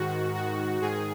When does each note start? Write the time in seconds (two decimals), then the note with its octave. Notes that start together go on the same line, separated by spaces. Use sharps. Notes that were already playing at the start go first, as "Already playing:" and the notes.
Already playing: G#2 D#3 F#4
0.35 F#4
0.82 G#2 D#3 G#4